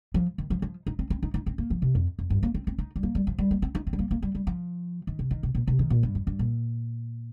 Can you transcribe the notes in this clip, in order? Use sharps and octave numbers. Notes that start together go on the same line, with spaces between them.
F3
D#3
F3
F3
D#4
C4
C4
D#4
D#4
C4
A#3
F3
C3
F2
F2
G2
A#3
C4
C4
D#4
G3
A#3
G3
F3
G3
A#3
C4
D#4
C4
G3
A#3
A#3
G3
G3
F3
D#3
C3
D#3
C3
A#2
C3
D#3
A#2
G2
F2
G2
A#2